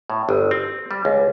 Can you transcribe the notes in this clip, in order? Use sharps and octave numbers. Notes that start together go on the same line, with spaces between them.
A2
G1
C4
G3
C#2